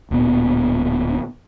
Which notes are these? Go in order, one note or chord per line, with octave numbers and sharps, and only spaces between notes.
D1 A#2 B3